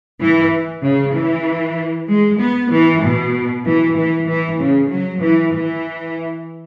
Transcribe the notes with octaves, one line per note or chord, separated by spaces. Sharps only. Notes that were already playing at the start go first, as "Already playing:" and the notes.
E3
C#3
E3
G#3
B3
E3
B2
E3
E3
E3
C#3
F#3
E3
E3